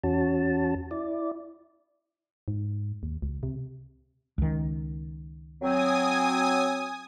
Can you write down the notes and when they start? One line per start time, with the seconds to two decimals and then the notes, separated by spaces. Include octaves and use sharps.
0.03 E2 C#4 F#4 A5
0.91 E4 D5
2.48 G#2
3.03 D#2
3.22 C#2
3.43 C3
4.38 C#2 D#3
5.62 F#3 C4 G#5 D#6